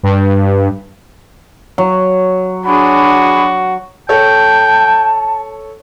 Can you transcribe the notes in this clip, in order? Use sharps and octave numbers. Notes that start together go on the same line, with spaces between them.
G2
F#3
D4 F#4 G#4 B5
A4 C#5 G5 A5